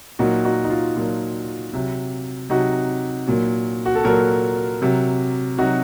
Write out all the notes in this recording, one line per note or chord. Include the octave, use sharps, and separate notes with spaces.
A#2 F#3 D#4 F#4
D#4 F#4
D#4
F4
A#2 F#3 F4
C3 F#3
C3 F#3 D#4 F#4
A#2 F#3
F#4
A4
A#2 F#3 F#4 A#4
C3 F#3
C3 F#3 D#4 F#4